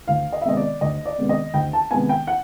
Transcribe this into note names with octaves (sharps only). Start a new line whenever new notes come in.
D2 F5
D#5
E5
C3 D#3 G#3 B3 D#5
D5
D2 D#5
D5
C3 D#3 G#3 B3
D#5
D2 G5
A5
C3 D#3 G#3 B3 G#5
G5
F#5